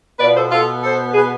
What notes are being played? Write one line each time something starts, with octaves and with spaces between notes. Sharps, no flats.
B2 B3 F4 B4 D5
A4 C5
F4 A4
A4 C5
G#4 B4